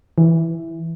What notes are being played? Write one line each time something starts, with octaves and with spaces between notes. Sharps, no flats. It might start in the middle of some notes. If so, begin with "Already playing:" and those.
E3